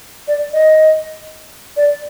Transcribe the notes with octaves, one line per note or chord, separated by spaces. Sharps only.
D5
D#5
D5